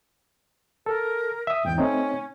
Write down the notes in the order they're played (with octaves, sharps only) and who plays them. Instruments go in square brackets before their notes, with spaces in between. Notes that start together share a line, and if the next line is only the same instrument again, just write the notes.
[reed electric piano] A4 [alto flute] A#4
[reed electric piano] E5 D#6
[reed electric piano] E2 G#2 [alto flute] G5
[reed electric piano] A3 C4 D#4 [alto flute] C#4